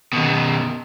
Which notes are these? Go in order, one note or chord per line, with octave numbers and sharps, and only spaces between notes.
B2 D#3